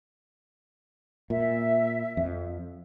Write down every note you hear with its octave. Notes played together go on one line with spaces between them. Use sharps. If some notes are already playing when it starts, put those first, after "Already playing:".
A#2 E5
F2